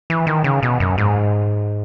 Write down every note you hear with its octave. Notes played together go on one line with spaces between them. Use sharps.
E3
D#3
C#3
B2
F#2
G#2